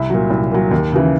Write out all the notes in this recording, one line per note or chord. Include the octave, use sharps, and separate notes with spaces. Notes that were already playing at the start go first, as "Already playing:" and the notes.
Already playing: C2 E5
A#2 F#3
C2
A#2 F#3
D#2
C#3 E3